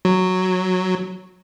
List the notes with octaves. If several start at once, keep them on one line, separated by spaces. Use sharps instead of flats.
F#3